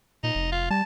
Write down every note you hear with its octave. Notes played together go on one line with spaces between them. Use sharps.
A#2 D#4
F1
F4
G3 A5